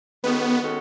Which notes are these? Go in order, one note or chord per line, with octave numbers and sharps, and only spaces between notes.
D#3 G#3 B3 C#4 F#4 A4
D#3 G#3 C#4 F#4 A4